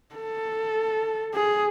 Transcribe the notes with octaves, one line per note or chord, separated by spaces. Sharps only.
A4
G#4